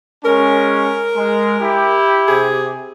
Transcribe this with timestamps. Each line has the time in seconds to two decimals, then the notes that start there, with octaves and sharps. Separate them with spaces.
0.24 G#3 C#4 A#4
1.16 G#3
1.61 E4 G4
2.28 C3 G#4